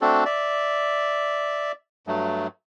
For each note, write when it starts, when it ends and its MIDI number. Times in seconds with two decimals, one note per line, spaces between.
0.01 0.24 57
0.01 0.24 60
0.01 0.24 62
0.01 0.24 66
0.01 0.24 69
0.25 1.72 74
0.25 1.72 76
2.07 2.47 43
2.07 2.47 54
2.07 2.47 57